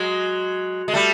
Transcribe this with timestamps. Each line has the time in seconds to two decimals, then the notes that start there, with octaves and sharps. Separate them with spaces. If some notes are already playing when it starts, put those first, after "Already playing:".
Already playing: F#3 G#3
0.88 G#3
0.94 G3 A3